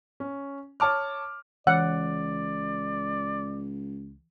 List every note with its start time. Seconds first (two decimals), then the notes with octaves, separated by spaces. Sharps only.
0.20 C#4
0.80 C#5 A5 D6 F6
1.67 C#2 E3 D5 F#5